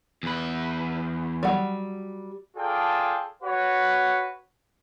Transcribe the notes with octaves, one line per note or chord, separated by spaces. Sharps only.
E2 B4
F#3 G3
F4 G#4 A4 D5 G5 A5
F#4 B4 C#5 F#5